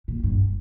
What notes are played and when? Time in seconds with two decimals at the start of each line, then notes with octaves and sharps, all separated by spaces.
0.08 A#2
0.24 G2